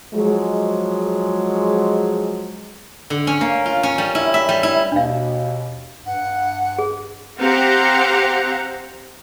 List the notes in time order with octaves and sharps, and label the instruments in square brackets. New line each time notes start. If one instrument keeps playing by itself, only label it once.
[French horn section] F3 F#3 G#3
[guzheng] D3
C#4
A#3
F4
C#4
G3
E4
E5
G3
E4
[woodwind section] D#2 B2 [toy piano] D4 F5
[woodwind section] G2 [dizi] F#5
[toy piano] G#4
[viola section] C4 G4 C5 F5 F#5 A#5